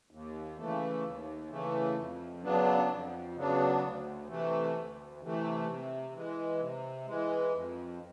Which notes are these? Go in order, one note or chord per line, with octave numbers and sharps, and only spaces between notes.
D#2
C#3 E3 A3
D#2
C#3 E3 A3
F2
C#3 F#3 B3 D4
F2
C#3 F#3 B3 D4
D2
C3 E3 A3
D2
C3 E3 A3
C3
E3 G#3
C3
E3 G#3
F2